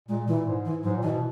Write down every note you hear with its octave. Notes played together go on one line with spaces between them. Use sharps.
A#2 G#3
A#2 E3
G#2
E3
G#2 F#3
A#2
B2 E3